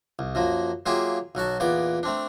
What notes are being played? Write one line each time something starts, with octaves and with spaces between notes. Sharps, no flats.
C2
F#2 F3 A#3
F#3 A#3 F4 G4 G#4 E5
B1 F#3 F#4 A5
E2 A#2 B3 D5 D6
A3 C4 D4